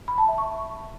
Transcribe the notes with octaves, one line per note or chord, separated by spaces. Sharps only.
B5
A5
E5
C#6